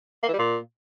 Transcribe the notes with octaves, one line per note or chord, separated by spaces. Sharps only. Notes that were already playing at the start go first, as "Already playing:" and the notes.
A#3
E3
G3
A#2